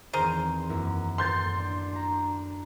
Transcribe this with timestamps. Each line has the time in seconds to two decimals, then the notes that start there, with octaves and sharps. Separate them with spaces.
0.13 E2 D#3 C4 G#4 A#4 C5
0.69 F#2 A#3 E4
1.18 F#2 A2 B3 C6 G6 A6
1.56 D4
1.93 A5 A#5